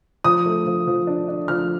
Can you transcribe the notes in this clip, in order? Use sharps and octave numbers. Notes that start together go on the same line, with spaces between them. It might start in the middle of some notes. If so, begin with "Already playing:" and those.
F3 D#6
A3
F3
F3
D4
D4
F3 F6